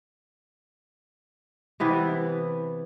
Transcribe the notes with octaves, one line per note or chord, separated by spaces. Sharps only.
C3 E3 B3 E4